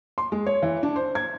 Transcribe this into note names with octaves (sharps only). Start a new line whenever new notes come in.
C6
G#3
C#5
E3
D4
C5
G#6